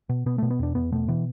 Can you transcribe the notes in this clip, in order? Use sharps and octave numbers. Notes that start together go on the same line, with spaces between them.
B2
B2 B3
B2 A3
B3
E2 D4
E2 B3
B2 A3
B2 E3